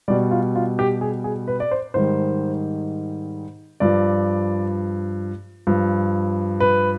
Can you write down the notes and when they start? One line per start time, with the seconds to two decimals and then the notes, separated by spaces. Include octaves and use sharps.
0.08 B2 G3 D5
0.31 F4
0.55 F4
0.79 G4
1.01 G#4
1.24 G#4
1.48 B4
1.60 D5
1.71 C5
1.94 G#2 D#3 G3 C5
3.80 G2 F3 D5
5.67 G2 F3
6.60 B4